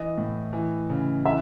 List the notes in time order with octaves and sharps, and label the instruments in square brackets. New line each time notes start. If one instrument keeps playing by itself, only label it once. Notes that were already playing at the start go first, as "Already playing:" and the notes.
Already playing: [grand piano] E3 [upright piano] D#5
[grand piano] A2
E3
C#3
[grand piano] E3 [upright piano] E5